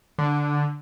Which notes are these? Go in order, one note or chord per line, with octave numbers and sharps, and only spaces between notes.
D3